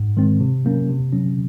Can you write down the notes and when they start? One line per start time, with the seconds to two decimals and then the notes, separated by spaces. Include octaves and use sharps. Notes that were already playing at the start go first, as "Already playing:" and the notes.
Already playing: G#2
0.17 D#3 G#3 C4
0.40 C3
0.65 F#3 A#3 C#4
0.90 C3
1.13 F#3 C#4